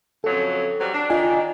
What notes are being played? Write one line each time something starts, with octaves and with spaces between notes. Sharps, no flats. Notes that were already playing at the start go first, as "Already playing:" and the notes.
F2 C#3 F#3 A4
F#3 G3 C5
D4
D#3 D4 F4 D#5 G#5